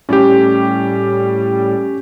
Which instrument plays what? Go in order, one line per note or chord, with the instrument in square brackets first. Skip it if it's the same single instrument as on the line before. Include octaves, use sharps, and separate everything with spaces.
[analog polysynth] A2 G3 [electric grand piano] C#4 G4